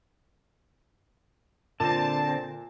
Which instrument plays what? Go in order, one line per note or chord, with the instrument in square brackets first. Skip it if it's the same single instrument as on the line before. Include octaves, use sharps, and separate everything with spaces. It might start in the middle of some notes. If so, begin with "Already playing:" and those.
[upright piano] A#2 [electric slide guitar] D3 C4 [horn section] A5